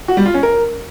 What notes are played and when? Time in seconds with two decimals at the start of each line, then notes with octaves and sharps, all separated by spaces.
0.08 F#4
0.17 G3
0.26 F4
0.34 C#4
0.43 A#4